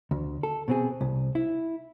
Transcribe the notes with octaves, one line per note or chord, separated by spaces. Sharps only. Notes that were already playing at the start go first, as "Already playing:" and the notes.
D2
A4
B2 C4 G#4
C2
E4